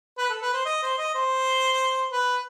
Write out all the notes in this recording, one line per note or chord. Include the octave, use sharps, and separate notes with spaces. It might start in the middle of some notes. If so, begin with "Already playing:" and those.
B4
A4
B4
C5
D#5
C5
D#5
C5
B4